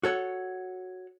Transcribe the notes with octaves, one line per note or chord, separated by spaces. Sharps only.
F#4 A4 C#5 F#5